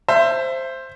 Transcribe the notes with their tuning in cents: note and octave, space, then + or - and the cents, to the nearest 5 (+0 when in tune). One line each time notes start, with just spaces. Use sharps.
C5 +5 E5 +25